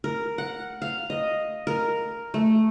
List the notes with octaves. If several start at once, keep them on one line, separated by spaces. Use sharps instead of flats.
A#4
F#5
F5
D#5
A#4
A3